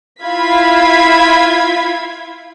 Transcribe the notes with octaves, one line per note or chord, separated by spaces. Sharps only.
E4 F4 F5 B5 G#6 B6